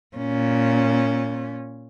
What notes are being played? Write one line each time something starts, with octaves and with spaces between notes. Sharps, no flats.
A#2 C#4